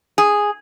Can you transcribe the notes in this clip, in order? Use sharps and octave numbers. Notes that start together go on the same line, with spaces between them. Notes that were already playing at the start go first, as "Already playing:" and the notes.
G#4